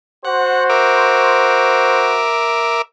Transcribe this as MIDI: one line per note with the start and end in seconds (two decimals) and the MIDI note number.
0.25 2.26 66
0.25 2.26 72
0.25 0.64 78
0.70 2.82 70
0.70 2.82 76
0.70 2.82 86